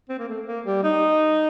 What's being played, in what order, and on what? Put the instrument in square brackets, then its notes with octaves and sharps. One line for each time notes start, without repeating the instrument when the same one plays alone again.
[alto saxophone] C4
A#3
A3
A#3
G3
D#4